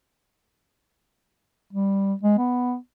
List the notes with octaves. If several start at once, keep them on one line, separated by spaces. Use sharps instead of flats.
G3
G#3
B3